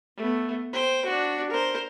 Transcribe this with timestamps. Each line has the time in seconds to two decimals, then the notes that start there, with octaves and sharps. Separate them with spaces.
0.17 A3 B3
0.73 C5 G5
1.06 D4 F#4
1.50 A#4 C5